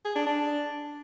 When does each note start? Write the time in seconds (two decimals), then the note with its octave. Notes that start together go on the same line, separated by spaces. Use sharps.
0.05 G#4
0.16 D4
0.26 D4